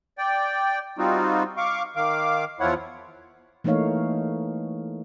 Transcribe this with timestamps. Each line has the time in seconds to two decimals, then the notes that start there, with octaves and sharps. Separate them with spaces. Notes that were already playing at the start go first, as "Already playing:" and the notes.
0.18 D5 G5
0.98 G3 C4 D#4 F4 F#4
1.57 F5 C#6 D6
1.96 D#3 F5 D6
2.60 E2 F3 E4 F4 C#5 F#5
3.64 E3 A3 A#3 D#4 C#5 F5